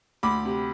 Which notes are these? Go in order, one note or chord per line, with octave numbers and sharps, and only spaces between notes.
D2 B5 D6
C3